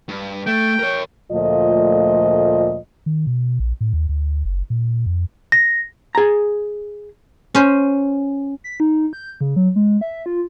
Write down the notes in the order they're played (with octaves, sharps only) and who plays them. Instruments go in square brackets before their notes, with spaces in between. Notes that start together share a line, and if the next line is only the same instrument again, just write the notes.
[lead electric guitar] G2
[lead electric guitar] A3 [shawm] G5
[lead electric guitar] A#4 C#5
[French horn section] D2 A#2 F3 A3 F4 D#5
[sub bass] D#3
B2
A#1
A2
D#2
D2
F#1
A#2
F2
[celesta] A#6
[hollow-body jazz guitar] G#4 A#5
[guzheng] C#4 C5
[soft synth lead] B6
D#4
G6
C#3
F#3
G#3
E5
F4